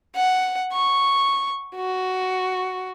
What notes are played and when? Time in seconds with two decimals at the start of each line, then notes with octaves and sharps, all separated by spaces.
0.16 F#5
0.73 C#6
1.75 F#4